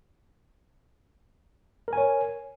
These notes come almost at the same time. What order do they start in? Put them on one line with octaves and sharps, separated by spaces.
A#4 G#5 C#5